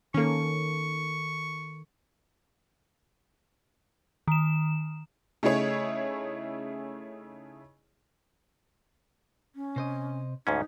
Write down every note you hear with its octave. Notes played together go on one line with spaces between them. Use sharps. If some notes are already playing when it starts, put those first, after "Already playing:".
D#3 A#3 C#4 A4 C#6
D#3 E7
C#3 A3 D#4 E4 G#4 C#5
C#4
C3 C5 D#5
D2 G#2 C#4 D#4